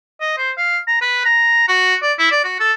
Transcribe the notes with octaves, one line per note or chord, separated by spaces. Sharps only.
D#5
C5
F5
A#5
B4
A#5
F#4
D5
E4
D5
F#4
A4